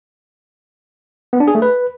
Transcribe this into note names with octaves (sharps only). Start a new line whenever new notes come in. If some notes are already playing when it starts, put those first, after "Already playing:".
B3
D4
G#4
A3
B4